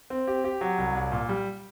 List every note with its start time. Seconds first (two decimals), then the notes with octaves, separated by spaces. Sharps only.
0.10 C4
0.27 G4
0.44 G4
0.61 F#3
0.78 C2
0.95 C2
1.12 A#2
1.29 G3